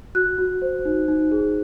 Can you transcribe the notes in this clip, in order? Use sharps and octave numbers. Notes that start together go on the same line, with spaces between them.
F#4 F#6
F#4
C5
D#4
D#4
G#4